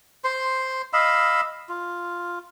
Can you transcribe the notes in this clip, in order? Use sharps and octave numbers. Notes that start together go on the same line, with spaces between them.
C5 C6
D#5 F5 B5 E6
F4